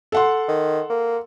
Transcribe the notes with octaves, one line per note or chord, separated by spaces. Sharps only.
A4 F#5 C6
D#3
A#3